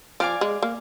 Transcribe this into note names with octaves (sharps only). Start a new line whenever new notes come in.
F3 D5 F5 G#5 D6
G#3
A#3